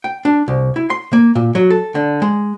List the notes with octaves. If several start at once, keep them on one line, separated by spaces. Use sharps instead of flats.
G5
D4
C2
E4
C6
A#3
A#2
F#3
A4
D3
G#3